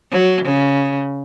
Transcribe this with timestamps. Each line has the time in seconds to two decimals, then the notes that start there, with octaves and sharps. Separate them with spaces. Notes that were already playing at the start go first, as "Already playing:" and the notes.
0.12 F#3
0.45 C#3